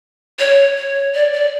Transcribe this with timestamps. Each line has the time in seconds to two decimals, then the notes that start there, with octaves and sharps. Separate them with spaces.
0.39 C#5
0.77 C#5
1.14 D5
1.33 D5